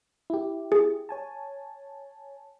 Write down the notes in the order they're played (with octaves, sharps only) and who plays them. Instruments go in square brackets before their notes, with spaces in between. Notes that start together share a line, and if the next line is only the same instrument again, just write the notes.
[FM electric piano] E4 G4
[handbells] G#4
[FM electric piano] C#5 G#5 A5